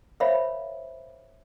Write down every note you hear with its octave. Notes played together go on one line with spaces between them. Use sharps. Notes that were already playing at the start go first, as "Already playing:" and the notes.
A#4 C5 C#5 E5 F5 B5